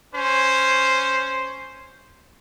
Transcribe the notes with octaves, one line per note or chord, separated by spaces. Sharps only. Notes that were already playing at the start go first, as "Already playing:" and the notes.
C#4 C5